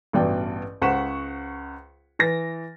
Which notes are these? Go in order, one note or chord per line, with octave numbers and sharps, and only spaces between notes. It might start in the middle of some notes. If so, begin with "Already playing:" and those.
A1 G2 B2 D5 G5
C#2 C5 F#5 C#6 B6 E7
E3 A6 A#6